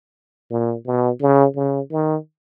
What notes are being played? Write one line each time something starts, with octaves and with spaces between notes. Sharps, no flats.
A#2
B2
C#3
C#3
D#3